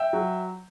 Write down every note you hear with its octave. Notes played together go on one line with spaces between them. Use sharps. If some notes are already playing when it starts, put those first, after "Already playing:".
Already playing: E5 G5
F#3